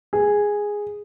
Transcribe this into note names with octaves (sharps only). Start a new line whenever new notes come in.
G#4